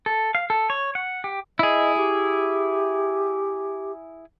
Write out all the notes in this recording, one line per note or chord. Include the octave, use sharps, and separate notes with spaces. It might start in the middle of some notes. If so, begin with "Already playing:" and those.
A4
F5
A4
C#5
F#5
G4
E4 G#4 D#5
G4